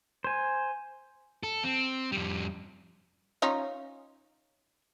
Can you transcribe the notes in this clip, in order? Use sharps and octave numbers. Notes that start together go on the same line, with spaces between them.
C5 G#5
A4
C4
F2 G3
C#4 D#4 F4